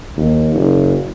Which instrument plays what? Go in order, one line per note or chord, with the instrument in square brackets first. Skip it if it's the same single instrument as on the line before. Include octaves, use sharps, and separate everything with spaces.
[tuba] D#2
F#1